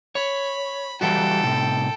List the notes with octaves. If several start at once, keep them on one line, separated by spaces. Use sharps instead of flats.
C#5 B5
E3 G3 F#4 A4 G5
A2 C3